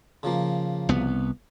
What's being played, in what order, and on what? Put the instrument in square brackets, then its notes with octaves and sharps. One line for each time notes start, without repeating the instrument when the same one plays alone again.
[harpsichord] C#3 F3 A#3
[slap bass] C2 B3